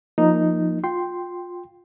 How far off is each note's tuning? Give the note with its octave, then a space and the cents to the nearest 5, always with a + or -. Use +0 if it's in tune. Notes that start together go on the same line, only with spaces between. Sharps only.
F3 +0 A#3 +0 D#4 +0
F4 +25 G5 +0 C6 +0